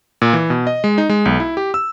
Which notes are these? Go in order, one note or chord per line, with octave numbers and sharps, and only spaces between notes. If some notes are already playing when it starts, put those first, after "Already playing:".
A#2
E3
B2
D#5
G#3
D#4
G#3
B1
E4
G4
E6